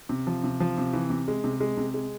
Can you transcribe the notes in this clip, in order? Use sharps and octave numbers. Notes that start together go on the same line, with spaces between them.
C3
F3
C3
F3
C3
E3
C3
G#3
C3
G#3
C3
G#3